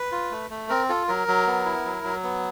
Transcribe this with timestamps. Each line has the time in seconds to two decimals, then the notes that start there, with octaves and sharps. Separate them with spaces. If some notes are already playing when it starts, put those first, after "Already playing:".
Already playing: B4
0.12 F4
0.31 A3
0.50 A3
0.69 C4 A#4
0.89 F4 A4
1.08 F#3 A#4
1.28 F#3
1.47 B3
1.65 E4
1.85 F#3
2.04 F#3
2.23 B3